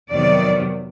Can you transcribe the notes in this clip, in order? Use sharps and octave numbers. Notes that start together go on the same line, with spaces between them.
F2 C3 D#3 F#3 B3 D5